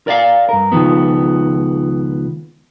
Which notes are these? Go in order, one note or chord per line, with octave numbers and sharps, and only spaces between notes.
A#4 D5 E5 F5
G2 A#4
C#2 D#3 F3 B3